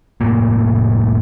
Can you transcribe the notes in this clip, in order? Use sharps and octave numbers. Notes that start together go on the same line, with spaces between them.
F1 A2 A#3